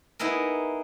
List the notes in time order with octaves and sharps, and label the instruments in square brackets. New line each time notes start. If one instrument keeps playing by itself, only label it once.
[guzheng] B3 D#4 E4 G#4 A#4